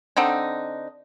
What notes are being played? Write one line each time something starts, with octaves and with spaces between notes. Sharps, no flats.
D3 C4 D#4